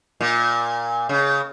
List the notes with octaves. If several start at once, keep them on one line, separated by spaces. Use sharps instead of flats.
A#2
C#3